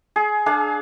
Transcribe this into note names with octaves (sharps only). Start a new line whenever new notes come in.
G#4
D4 G#4 F5